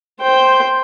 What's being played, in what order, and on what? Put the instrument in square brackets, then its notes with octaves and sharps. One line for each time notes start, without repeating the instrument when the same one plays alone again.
[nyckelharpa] C5 G5